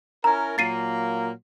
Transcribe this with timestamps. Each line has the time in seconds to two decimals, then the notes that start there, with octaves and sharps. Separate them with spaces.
0.24 C#4 E4 A#4 A#5
0.58 A#2 F#3 A#3 A6 C7 D#7